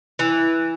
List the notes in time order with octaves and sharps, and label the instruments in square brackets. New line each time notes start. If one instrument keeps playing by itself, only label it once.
[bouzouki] E3